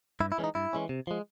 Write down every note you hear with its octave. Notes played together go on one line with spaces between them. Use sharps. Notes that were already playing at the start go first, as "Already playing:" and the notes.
G2 E4
E4
E3 G#3 C#4
D#4
G2 E4
E3 G#3 C#4
C3
F3 G#3